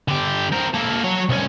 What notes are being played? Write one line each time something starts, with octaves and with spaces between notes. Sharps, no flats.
D3 G4
C4 A#4
A#3 A4
F#3 C#5
C2 C#4